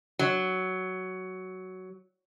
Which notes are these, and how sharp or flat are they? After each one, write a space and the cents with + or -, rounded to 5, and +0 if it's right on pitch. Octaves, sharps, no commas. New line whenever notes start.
F#3 +10